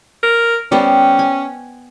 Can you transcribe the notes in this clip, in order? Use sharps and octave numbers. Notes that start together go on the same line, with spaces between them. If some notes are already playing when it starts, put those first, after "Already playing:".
A#4
G3 B3 C#4 C5
G#5